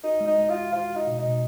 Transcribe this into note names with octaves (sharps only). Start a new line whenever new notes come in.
D#4 F#4
G#3
D#4
G#3
F4
F#4
F4 F#4
F#4
D#4
B2
D#4
B2